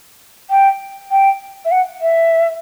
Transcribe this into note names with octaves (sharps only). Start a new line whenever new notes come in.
G5
G5
E5
F#5
E5